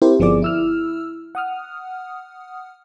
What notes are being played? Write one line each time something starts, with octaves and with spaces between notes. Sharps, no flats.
C4 E4 G4 A#4 C5
G1 F3 B3 G#4 D5 D6
E4 E6 F6
F#5 D#6 F6